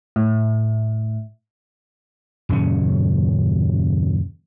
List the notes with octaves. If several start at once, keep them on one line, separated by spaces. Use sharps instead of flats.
A2
D#1 F#2 C#3 C#4